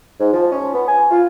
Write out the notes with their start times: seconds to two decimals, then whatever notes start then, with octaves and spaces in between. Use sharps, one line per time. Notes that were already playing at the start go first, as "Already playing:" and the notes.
0.20 G#2
0.33 F3
0.52 C#4
0.74 B3
0.88 G#5
1.11 F4